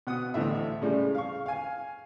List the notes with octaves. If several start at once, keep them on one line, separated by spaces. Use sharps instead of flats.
B2 F#5 D#6
A1 D2 A2 D#5 E5
A2 C#3 G3 G#3
F5 C#6
F5 G#5